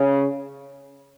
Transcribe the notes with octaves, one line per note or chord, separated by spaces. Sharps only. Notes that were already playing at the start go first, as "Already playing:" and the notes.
Already playing: C#3